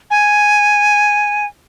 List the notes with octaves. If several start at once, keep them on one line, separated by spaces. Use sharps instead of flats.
G#5